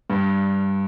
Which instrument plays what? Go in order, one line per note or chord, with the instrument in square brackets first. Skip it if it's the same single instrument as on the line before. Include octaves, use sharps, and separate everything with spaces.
[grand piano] G2